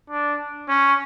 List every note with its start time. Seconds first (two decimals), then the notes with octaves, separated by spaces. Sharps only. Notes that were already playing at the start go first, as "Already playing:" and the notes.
0.10 D4
0.68 C#4